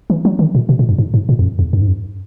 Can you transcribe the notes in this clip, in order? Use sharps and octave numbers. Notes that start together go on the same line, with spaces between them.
E3
F#3
D#3
A#2
B2
A#2
F#2
G#2
G#2
A#2
E2
F#2
E2
F#2
G#2
F#2